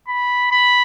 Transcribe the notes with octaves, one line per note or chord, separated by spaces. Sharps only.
B5
B5